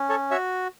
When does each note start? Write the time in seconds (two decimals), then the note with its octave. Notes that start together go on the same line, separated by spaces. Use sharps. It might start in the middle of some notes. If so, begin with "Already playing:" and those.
Already playing: C#4
0.09 A4 C#5
0.31 F#4 C#5 E5